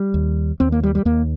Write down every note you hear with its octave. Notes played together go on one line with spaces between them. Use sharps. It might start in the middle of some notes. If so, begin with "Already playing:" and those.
Already playing: G3
D#2
D#2 C4
A#3
G3
G3
D#2 A#3